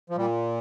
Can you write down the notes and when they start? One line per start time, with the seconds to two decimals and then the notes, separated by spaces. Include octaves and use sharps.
0.10 F3
0.17 A#2 G3